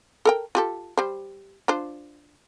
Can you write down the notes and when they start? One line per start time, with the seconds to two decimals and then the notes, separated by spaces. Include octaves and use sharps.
0.25 A4 A#4 G5
0.55 F4 G4 A4
0.98 G3 C5
1.68 D4 F4 C5